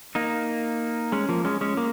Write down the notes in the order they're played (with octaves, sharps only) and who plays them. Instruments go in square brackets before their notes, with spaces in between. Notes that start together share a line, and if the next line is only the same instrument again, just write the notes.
[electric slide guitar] A#3 D#4
G#3 C#4
F3 A#3
G#3 C#4
G#3 C#4
A#3